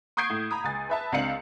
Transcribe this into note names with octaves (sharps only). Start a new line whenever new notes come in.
C#6 D#6 G6 G#6 C7 D7
A2
A#5 B5 D#6
C#2 G#5 A6
B4 E5 A5
C#2 C4 D4 F5 C#7 F#7